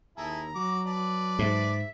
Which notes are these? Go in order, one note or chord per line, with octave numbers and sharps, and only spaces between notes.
D#2 E4 G#4 A4 A#5
F#3 F#4 D6
B4 D5 A5
G#2 E5